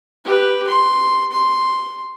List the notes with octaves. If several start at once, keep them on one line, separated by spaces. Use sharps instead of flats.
G4 B4
C6
C6